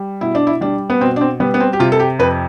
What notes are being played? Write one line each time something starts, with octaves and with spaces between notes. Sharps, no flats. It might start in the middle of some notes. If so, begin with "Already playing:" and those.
Already playing: G3
B2 E4
D4
E4
G3 D4
B3
B2 C4
D4
C4
G3 B3
B3
C4
G4
C3 F4
A4
G4
F2 B4